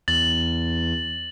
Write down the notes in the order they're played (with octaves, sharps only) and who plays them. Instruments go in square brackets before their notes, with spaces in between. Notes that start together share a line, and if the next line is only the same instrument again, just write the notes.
[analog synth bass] E2 [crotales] A6 F#7